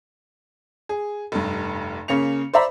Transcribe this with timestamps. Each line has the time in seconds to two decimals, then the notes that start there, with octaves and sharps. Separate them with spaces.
0.89 G#4
1.32 F1 G2
2.08 C#3 A#3 C#4 C#7 F7
2.54 C5 D5 E5 A#5 B5